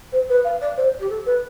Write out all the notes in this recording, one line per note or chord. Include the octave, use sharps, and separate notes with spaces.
C5
B4
F5
D5
C5
G4
A4
B4